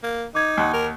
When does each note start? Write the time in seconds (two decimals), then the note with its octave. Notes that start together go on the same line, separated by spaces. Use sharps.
0.03 A#3
0.35 D#4 D6 G#6
0.57 D#2 F#5
0.73 A#4